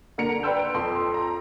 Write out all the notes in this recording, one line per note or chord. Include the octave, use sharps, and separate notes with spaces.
D3 A#3 A#5 C#7 D7 F7
B4 D5 G5 C6 E6 G6
D7
F2 C6
A#5